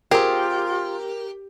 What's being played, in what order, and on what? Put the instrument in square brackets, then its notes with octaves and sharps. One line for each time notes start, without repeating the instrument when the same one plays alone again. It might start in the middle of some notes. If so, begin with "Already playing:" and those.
[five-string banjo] C4 G#4 [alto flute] F4 [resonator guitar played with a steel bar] G4 [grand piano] A#4